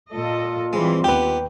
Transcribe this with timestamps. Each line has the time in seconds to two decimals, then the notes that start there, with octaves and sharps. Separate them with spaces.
0.12 A#2 F4 A4 D#5
0.73 E3 G3 G#3 C4
1.04 D#2 B3 G4 B4 G5